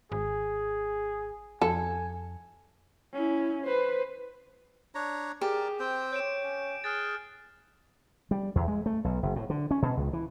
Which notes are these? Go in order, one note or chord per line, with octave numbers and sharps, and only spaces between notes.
G#1 G#4
F2 A4 G#5
C#4 E4
B4 C5
D4 C#5 A#5
G4 G#4 A#4 D5 D6
C4 G5
C#5 G6 D7 E7
C#4
G#4 F6 F#6 A6
G3
E2
G#3
A3
B1
F#1
A2
D3
C#4
B2
C#2
E3